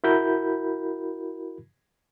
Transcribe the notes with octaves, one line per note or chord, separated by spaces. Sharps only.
E4 F#4 A#4 B5 G6